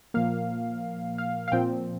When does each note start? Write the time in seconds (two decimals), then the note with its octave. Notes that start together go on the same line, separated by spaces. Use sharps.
0.14 A#2 F3 A#3 F5
1.18 F5
1.48 F5
1.52 A#2 F3 C4 G5